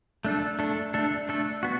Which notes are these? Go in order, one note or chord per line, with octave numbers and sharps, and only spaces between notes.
A3 D4 A4
A3 D4 A4
A3 D4 A4
A3 D4 A4
B3 F#4